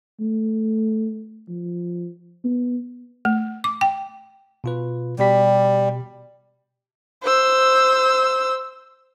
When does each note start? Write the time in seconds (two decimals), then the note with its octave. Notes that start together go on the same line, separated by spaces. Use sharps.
0.20 A3
1.49 F3
2.44 B3
3.25 A3
3.64 D6
3.81 G5
4.64 B2 F4 B4
5.19 B2 G3 G4 B6
7.23 C5 E6